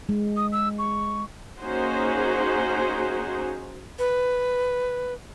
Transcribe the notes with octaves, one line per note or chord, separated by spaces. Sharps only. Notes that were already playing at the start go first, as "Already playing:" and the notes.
G#3
D#6
E6
C#6
A#3 C#4 D#4 F#4 G#4 C5
B4